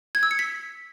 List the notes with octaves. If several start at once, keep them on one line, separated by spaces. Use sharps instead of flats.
G#6
E6
C#7
B6